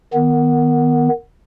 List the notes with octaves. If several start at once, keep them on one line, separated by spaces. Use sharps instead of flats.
D#3 B3